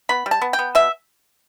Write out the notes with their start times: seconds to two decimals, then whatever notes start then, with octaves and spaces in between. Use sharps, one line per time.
0.09 B3 B5
0.26 G3
0.31 A5
0.42 B3
0.53 G5
0.59 B3
0.75 B2 E5